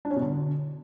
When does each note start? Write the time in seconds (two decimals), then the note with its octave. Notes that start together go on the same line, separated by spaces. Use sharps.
0.05 D4
0.11 C#4
0.16 B2
0.22 D3